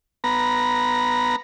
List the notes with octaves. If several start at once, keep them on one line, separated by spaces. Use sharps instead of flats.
B3 A#5